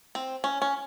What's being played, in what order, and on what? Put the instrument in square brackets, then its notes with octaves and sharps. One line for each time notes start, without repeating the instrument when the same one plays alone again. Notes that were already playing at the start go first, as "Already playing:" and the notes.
[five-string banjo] C4
C#4
C#4